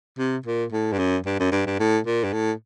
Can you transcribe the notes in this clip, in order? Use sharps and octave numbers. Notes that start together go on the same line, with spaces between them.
C3
A#2
A2
G2
F#2
G2
F#2
G2
G2
A2
A#2
G2
A2